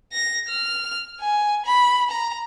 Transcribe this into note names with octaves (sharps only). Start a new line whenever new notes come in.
A#6
F6
G#5
B5
A#5